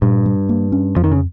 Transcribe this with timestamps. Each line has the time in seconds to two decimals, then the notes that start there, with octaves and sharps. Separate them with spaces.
0.02 G2 A#2
0.26 G3
0.49 A#3
0.72 C#4
0.96 F2 F3
1.04 D#3
1.12 C#3